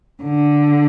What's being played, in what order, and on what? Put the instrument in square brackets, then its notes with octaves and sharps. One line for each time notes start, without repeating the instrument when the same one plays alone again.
[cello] D3